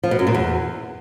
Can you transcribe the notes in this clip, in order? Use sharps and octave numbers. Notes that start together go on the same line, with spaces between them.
F3
B2
F#2
A#2
E2